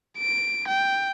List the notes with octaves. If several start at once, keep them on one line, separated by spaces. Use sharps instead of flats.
D7
G5